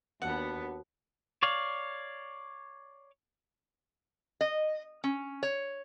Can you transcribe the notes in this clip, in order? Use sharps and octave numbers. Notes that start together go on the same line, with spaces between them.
D#2 B3 D4 F#4 F#5 A5
C#5 D5 F5
D#5
C#4
C#5